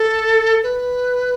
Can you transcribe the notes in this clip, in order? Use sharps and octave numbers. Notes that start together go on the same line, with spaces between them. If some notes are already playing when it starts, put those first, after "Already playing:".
Already playing: A4
B4